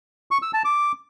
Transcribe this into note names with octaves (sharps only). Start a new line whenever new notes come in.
C#6
E6
A5
D6